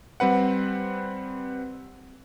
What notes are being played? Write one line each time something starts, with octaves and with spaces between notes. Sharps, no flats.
G3 C4 B4 F#5